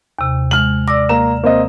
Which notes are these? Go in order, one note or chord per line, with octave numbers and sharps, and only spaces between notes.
D#2 C3
G#3 F6 F#7
D5 D6 E6 A#6
A#3 A#5 E7
A#3 C4 D#5